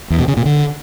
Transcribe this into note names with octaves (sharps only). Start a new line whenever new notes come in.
E2
B2
C#3
A#2
D3